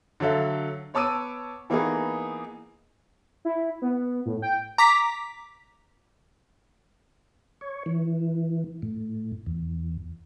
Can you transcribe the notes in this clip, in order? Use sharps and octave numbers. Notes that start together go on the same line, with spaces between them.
D3 F#3 A4 E5 F5
B3 C#5 A5 D6 E6 D#7
E3 A#3 B3 D#4 G#4
E4
B3
A2
G5
A#5 D6 B6
C#5
E3
A2
E2